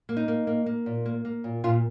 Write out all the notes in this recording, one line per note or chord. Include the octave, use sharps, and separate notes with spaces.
A#3
D#4
A#3
A#3
A#3
A#2
A#3
A#3
A#2
A#2 F4